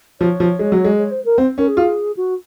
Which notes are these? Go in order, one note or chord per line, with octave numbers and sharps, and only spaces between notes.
F3 C#5
F3
G#3
F#3
G#3
C#5
C5
A#4
C4 C5
C#4 A#4
G#4
F4
F#4